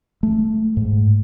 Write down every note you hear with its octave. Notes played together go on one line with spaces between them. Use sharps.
A3
G#2